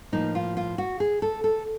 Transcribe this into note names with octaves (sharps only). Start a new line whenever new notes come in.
A2 F3 A#3 D#4
F4
F4
F#4
G#4
A4
A4